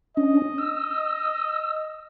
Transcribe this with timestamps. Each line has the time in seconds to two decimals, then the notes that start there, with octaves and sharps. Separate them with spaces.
0.17 C#4 D4 D#5
0.58 E6